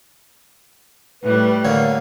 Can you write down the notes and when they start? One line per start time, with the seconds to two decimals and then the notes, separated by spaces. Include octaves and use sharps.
1.23 A2 G3 B4
1.65 D3 A#3 C#5 F5